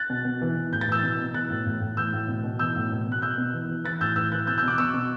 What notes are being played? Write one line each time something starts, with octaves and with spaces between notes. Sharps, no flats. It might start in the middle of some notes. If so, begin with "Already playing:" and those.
Already playing: F#6 A6
B2
B2
E3
E3
A2 G6
A6
E3 E6 G6
B2
B2
E3 F#6 A6
A2
A2
A2
E3 E6 G6
A2
B2
B2
E3 E6 G6
A2
B2
B2 F#6
B2 E6 G6
B2
E3
E3
E3 F#6 A6
A2 E6 G6
E3 E6 G6
E3 F#6 A6
B2 E6 G6
E6 G6
B2
D6 F#6
B2 C#6 E6
B2